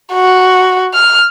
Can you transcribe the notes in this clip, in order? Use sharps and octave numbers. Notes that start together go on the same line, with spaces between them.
F#4
F6